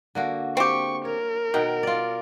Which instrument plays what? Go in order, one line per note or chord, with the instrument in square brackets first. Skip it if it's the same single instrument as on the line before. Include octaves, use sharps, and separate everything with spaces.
[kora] D3 A#3 F#4
[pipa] C4 G4 [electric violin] C#6
[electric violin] A#4 [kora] C#5
[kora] B2 F#5 G5 [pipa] D#3
[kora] F4 D5